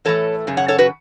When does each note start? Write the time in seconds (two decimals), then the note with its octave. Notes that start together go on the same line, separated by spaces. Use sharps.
0.05 A2 E3 A3 A4 C#5
0.47 F#2 C#3
0.57 C#5 F#5
0.68 A4 C#5
0.78 F#4 B4